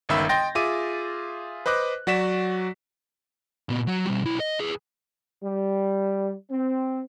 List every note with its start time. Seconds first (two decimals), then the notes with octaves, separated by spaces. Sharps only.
0.09 G1 C#2 D#3 E5 B5 E6
0.29 D#5 G5 C6 G6 A6 A#6
0.55 F4 G#4 E5 D6 D#7
1.66 B4 C5 D#5 D6 F#6
2.07 F#3 F#4 D5 B6 E7
3.69 A#2 B3
3.87 F#3 F#4
4.07 B2 G3
4.24 B1 E4
4.40 D#5
4.60 G#4 B4
5.43 G3
6.51 C4